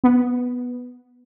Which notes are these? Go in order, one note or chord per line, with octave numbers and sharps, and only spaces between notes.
B3